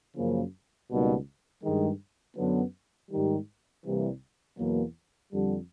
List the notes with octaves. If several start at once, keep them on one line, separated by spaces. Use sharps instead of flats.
F#2 C#3 F3 A#3
C#2 B2 G3 A#3 D#4
G2 D#3 G#3
F#2 D3 F#3 B3
G#2 D#3 G3
C2 C3 E3 G3 A#3
E2 B2 F#3 A#3
F2 D3 G3